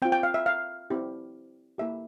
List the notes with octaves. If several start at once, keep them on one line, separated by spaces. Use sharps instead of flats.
C4 F4 G5
G5
F5
E5
F5
C4 E4 G4
A#3 E4 G4 E5